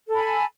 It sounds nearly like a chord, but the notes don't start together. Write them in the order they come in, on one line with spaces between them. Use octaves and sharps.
A4 B5 G#5 A5